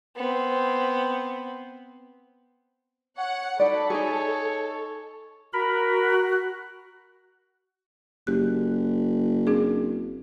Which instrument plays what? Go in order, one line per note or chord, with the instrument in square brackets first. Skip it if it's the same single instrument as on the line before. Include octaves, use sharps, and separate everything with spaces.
[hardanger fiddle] B3 C4
[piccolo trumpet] C#5 [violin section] F#5
[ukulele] D#4 D5 [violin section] A4 [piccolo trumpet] B5
[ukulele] D#4 G#4 [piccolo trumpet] C#5
[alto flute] F#4 [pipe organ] A#4 B5
[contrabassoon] F#1 [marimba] G4 F#6
[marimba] C4 D4 G#4